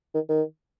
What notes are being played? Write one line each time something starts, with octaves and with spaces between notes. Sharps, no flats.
D#3
D#3